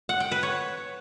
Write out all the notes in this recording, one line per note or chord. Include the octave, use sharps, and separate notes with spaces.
F#5
G5
B4
C#5